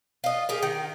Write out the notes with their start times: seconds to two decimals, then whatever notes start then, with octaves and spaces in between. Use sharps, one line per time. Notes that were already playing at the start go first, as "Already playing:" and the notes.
0.24 F4 D#5
0.49 G4 G#4 A#4
0.62 D#3